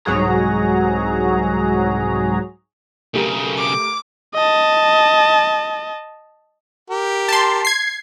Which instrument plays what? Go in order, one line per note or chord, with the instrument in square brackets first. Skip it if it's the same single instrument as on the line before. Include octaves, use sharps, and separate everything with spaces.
[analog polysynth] C2 G#2 F#3 F#4 G#4 A#5
[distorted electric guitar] B1 C#3 [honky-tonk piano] A3 G4 A#4
[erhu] D6
[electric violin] D#5 A5
[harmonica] G4 A#4
[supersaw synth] A5 C6
G#6 C7